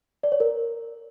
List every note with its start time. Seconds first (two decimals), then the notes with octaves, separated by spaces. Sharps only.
0.23 D5
0.32 C#5
0.40 A#4